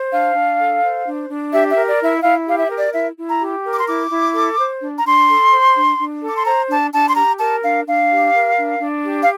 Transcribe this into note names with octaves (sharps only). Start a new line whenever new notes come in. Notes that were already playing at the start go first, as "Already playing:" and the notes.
Already playing: C5
D4 F5
D4
A4
C5
D4
D4
G4 E5
A#4 E5
D5
E4
E5
E4 F5
G4 F5
E5
A#4
D5
E4 E5
E4
A#5
G4
A#4
D6
C6
E4 D6
E4
A4
C5
D4
A#5
D4 C6
A4
C5
D4
D4
A4
D6
C6
C5 A#5
D4 A5
D4 A5
C6
G4 A#5
A#4 A5
D4 F5
D4 F5
G4
A#4
D4
D4
G4
F5